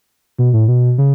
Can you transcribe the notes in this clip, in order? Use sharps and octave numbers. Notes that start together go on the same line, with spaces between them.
B2
A2
B2
C#3